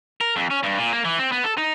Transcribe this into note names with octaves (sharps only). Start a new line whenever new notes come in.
A#4
F2
C#4
G2
A#2
A#3
E3
C4
B3
A4
D#4